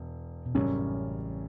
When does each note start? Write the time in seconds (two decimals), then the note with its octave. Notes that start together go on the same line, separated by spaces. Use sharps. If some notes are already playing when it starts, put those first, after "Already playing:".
Already playing: E1
0.46 B2
0.54 A1 F#2 A2 C#3 G3 C#4